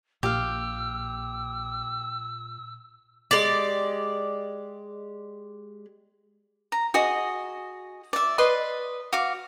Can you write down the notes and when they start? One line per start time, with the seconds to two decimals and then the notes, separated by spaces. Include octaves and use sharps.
0.23 A#1 A#2 G4 F5 E6
3.31 G#3 G4 D5
6.72 A#5
6.94 F#4 G#4 D#5
8.13 D5 E5
8.38 B4 D5 D#5 C6
9.13 F#4 F5 D6